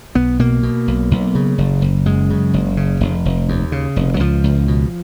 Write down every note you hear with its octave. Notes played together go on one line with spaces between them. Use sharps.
B1 B3
B2 A#3
B2
B1
B1
C#3
F#1
F#1
F#2 G#3
C#3
F#1
C#3
F1
F1
D#2
C#3
F1
F#3
C#2 F3
C#2
B2